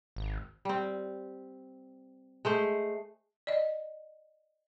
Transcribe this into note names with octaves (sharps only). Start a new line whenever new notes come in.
G#1
G3 C4
G#3 A3 C5
D5 D#5